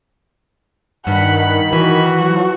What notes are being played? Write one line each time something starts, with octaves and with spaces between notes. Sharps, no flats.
G2 D#3 F#5 B5
E3 F#4
F3 F#3